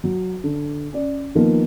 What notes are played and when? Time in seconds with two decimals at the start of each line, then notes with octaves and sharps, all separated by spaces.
0.04 F#3
0.44 D3
0.93 C#4 D5
1.35 D#3 F3 A#3 B3